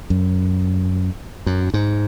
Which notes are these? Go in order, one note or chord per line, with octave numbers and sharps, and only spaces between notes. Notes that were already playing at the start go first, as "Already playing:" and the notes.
F#2
F#2
G#2